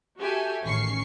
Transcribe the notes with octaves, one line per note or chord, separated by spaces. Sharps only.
F#4 G4 A4 E5 G#5
A1 D#3 C#4 C#6 C7